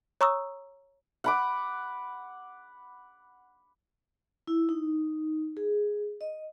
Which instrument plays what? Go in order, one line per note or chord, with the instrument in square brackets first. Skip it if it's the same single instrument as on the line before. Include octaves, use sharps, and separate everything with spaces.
[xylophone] C#5 A#5 C#6 D#6 E6
[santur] F#5 B5 D6
[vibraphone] E4
D#4
G#4
D#5